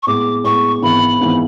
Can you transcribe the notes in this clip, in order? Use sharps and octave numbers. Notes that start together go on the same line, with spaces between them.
C#6
A2 G#3 B3 D6
A2 G#3 B3 C#6
G#1 G#2 E3 B3 B5
G#1 G#2 E3 B3